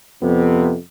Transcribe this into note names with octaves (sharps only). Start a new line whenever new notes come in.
F2 C3 B3